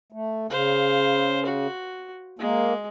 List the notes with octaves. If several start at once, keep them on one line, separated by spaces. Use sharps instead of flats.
A3
C#3 C5 F5
F#4
G#3 A#3